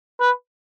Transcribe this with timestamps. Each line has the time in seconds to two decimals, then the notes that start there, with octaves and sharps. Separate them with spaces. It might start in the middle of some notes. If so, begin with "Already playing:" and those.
0.20 B4